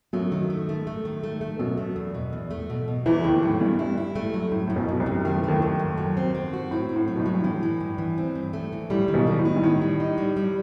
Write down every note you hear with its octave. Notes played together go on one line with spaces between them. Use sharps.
F#2 F#3 A3
D#3
A3
A3
A3
D#3
A3
A3
F#2 B2 F#3
A3
E2
B2
E2
A3
B2
B2
E2 E3 E4
D#2 D#3 A3
A2 F#3
G2 E4
G2 E4
E4
A3
F#3
F#2 A2
F#2 A2
B1 B2
F#2 B2
C2 C3
F#2
D#3 A3
E3
D#2 D#3 A3
F#2
F#2
F#3
C4
C4
F#4
A2 C4
C4
A2
F#3
B2
A2
F#3
G2
A2 E3
E3
G2
E3
C4
G2
A3
E3
A2 G3
D#3
B1 B2
D#3
A2
D#4
G2
A2 D#3
G3
D#4
G3
G3